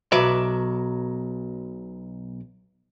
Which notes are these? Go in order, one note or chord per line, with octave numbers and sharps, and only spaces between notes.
B1 F#3 B4 D5 E5